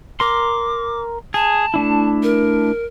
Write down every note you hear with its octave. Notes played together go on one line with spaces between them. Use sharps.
A#4 C6 D6
G#4 A5
A3 D4 E4
A#4